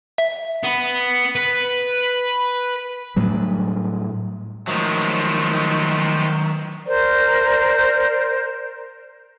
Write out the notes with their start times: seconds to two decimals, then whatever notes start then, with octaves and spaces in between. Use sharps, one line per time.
0.18 E5
0.64 B3
1.35 B4
3.16 A2 F#3 G3
4.67 D#3 F3 F#3 G#3 A3
6.85 A#4 C5 D5